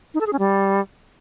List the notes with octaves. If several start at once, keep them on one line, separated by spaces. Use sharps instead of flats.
D#4
A4
G#4
C#4
G3